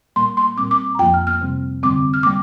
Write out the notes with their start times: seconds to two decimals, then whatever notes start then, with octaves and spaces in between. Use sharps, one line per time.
0.16 A#2 G3 A#3 C6
0.37 C6
0.57 A#2 G3 C4 D6
0.71 D6
0.95 A#5
0.99 F2 F3 A#3 G5
1.14 F6
1.27 F6
1.41 C3 G3 C4
1.83 G2 D3 G3 C4 D6
2.14 F6
2.23 G3 A#3 D6